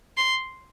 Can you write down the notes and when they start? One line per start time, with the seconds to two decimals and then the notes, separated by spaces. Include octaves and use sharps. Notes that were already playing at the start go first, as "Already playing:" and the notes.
0.17 C6